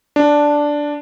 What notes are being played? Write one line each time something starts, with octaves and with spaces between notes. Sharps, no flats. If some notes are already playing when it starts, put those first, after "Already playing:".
D4